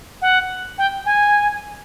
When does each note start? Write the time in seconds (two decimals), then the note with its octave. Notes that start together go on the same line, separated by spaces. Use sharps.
0.22 F#5
0.78 G5
1.06 G#5